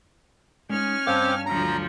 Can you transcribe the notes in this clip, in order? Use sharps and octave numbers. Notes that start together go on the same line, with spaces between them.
G#3 C#4 D#4 G#5 F6
G2 C4 F5 G5 A5 D6
D2 F3 F#3 A#5